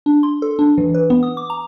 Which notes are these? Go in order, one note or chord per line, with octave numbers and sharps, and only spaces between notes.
D4
C6
A4
D4
E3
B4
B3
D#6
D6
A#5